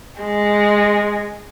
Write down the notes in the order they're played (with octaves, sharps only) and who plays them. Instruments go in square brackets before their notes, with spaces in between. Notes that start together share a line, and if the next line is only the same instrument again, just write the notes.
[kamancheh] G#3